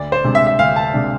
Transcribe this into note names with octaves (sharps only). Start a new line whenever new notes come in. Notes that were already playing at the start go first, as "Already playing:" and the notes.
Already playing: D2 D5
C5
C3 G#3 D4
E5
E5
D2 F5
A5
C3 G#3 D4